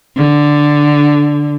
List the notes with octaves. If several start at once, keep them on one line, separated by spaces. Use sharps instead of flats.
D3